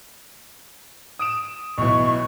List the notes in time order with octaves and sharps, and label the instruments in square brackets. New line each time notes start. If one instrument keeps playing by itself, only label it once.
[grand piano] D#6 D7 E7
[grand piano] B1 E3 [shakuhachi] C#6